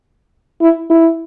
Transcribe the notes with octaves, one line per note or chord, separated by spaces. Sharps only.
E4
E4